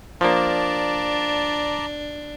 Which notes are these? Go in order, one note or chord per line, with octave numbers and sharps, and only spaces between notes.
F3 A#3 D4 D5 A5 A#5